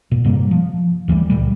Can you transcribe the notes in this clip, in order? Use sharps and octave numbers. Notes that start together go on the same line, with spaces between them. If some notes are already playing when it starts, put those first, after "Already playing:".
A#2
G2 C3 G3 A#3
F3
D2 E3 F3 G3
C#2 A#2 G3